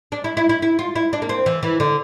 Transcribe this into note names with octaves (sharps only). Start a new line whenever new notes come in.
D4
E4
E4
E4
E4
F4
E4
D4
A#3
C4
E3
E3
D3